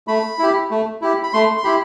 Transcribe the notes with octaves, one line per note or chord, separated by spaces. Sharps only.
A3 B5
E4 G4
A3
E4 G4
B5
A3 C6
C6
E4 G4 B5